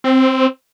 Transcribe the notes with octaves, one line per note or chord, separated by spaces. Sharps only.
C4